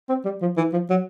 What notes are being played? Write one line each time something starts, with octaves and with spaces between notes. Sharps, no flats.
C4
G3
F3
E3
F3
F#3